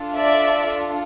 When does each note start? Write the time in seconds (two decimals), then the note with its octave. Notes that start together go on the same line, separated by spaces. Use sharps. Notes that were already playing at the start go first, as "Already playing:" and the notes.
Already playing: D4 F4 A4
0.17 D5 E5